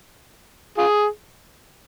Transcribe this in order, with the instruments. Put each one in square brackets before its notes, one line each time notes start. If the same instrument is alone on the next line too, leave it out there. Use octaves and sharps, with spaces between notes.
[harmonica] F4 G#4